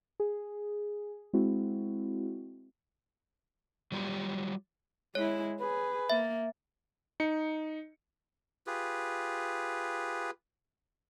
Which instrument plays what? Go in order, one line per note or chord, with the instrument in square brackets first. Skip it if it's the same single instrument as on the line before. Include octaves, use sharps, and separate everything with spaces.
[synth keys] G#4
G#3 C4 E4 F#4
[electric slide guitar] F#3 G3 F4 G4
[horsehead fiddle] G#3 E4 [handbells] C#5
[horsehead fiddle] G#4 [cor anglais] B4
[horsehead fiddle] A#3 [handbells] E5
[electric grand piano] D#4 C#7
[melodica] F4 G4 G#4 B4